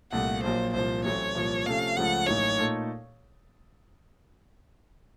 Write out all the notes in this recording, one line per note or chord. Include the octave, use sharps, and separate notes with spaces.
C2 A#2 A3 F#5
A#1 A#2 F#3 C5
C2 A#2 F3 C5
A1 A2 F#3 A3 C4 C#5
C2 A#2 F3 A#3
C3 F3 A3 C#4 A4 F5
C#2 C#3 F3 A3 F#5
A1 A2 F#3 A#3 D#4 C#5
A#2 A3 D#4 A4